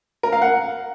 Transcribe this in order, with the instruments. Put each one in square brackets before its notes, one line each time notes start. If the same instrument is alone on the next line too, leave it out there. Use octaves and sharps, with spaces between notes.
[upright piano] A#4
F5
F#5